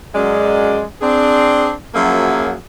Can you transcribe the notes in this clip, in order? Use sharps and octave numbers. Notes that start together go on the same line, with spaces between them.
F#2 G#3 D5
C4 D4 G#4
F#2 F3 F#3 A#3 G#4 E5